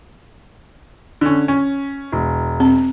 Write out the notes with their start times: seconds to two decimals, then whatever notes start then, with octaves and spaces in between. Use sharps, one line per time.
1.21 D3 C#4
1.48 C#4
2.12 E1
2.60 C4